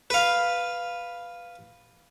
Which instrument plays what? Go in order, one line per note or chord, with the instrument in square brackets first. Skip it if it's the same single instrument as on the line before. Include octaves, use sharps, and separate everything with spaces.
[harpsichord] B4 F5